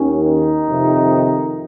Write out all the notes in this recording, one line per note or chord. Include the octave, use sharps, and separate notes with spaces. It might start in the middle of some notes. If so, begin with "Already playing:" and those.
Already playing: D#2 D#3 C#4
D#4
F2 C3 D#3